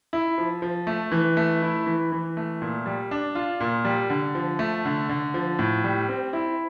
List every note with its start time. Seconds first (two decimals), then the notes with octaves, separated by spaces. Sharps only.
0.13 E4
0.38 F3
0.62 F3
0.87 A3
1.12 E3
1.37 A3
1.62 E4
1.86 E3
2.12 E3
2.37 A3
2.62 A#2
2.86 G3
3.11 D4
3.35 F4
3.60 A#2
3.85 G3
4.10 D3
4.35 F3
4.59 A3
4.85 D3
5.09 D3
5.34 F3
5.59 A2
5.84 G3
6.09 C4
6.33 E4